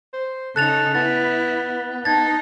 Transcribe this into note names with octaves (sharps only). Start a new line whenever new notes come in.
C5
C#3 D#4 A4 F#6 A6 F7
B3 E4 A6
D#4 A5 G#6 A6